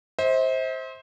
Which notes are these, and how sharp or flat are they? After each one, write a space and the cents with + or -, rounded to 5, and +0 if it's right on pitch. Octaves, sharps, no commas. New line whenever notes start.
C5 +10 E5 -45